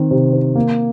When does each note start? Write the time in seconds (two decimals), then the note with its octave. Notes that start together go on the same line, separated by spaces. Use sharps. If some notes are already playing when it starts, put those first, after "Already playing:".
Already playing: D#3 C4
0.11 C3
0.33 C4
0.55 A#3